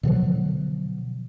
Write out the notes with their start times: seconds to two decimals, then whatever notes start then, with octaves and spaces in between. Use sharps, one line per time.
0.03 B2 D3 F3 F#3